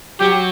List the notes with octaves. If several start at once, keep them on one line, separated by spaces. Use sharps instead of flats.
F#3 G4